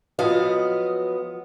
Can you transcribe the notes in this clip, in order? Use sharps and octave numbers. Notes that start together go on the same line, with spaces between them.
F3 F#3 G#3 B3 D#5 F5